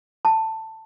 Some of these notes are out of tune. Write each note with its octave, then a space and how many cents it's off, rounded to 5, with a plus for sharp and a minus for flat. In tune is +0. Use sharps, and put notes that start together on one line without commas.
A5 +15